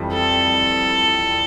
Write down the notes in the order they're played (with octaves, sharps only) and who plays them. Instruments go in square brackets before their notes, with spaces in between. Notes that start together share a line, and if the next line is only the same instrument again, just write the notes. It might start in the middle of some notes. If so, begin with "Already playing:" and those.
Already playing: [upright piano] F2 E3 G3
[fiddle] A4